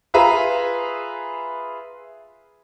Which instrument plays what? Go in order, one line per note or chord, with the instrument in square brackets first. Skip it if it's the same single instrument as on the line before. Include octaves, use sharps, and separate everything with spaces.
[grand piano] F4 G#4 B4 E5 F5 A#5